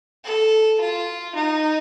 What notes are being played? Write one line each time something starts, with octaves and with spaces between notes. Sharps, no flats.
A4
F4
D#4